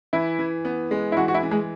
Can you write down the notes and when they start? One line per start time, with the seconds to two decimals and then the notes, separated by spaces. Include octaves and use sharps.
0.13 E3 E4
0.39 E3
0.65 B3
0.91 G#3
1.12 E4
1.17 E3 F#4
1.28 F#4
1.34 E4
1.43 E3
1.51 G#3